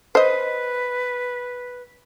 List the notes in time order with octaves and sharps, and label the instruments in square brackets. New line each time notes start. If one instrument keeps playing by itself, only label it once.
[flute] B4 [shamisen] C5 D#5